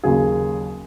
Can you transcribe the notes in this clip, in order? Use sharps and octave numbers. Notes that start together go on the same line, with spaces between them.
D#2 C#3 F#3 G#4